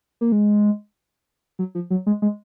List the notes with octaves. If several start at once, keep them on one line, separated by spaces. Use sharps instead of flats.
A#3
G#3
F#3
F3
F#3
G#3
G#3